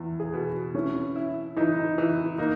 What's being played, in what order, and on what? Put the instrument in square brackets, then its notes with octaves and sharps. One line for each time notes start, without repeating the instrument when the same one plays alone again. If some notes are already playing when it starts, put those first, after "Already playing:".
Already playing: [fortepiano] E2
[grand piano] G#4
[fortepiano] B2
[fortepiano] E3 [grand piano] C#4
[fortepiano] E4
[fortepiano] E3 [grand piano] D#4
[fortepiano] E3
[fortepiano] A#3 [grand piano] D#4